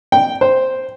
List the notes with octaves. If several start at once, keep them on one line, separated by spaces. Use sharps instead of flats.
G5
C5